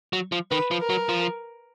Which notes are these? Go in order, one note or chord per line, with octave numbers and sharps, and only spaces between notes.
F#3
F3
D#3 B4
F3
A#4
F#3
F3